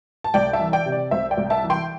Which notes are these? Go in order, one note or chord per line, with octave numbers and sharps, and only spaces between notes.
A5
C2 D5 G5
E5 A5
E3
D5 G5
C3
D5
C2 C5 E5
D5 G5
C2
E5 A5
E3
G5 C6